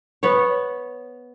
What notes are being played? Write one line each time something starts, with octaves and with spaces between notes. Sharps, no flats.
B3 C#5